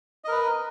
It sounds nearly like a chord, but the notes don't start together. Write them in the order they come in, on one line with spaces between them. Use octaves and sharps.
D#5 A#4 B4